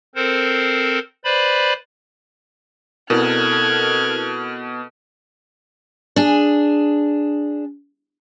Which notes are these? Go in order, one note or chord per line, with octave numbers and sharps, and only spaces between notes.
C4 A4 A#4 C5
B4 C5 D5 B5
B2 C4 E4 A4 A#4 F6 F#6 G#6
D4 G#4